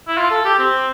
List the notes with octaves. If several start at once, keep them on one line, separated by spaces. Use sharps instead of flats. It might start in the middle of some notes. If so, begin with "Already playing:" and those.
E4
F4
A4
G4
C4